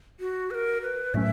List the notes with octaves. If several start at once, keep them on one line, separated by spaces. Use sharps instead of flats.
F#4
B4
A#4
B4
A2 F#3 A3 C#4 E5